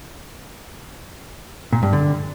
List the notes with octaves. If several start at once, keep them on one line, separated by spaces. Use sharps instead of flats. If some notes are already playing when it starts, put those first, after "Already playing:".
A#2
G2
D3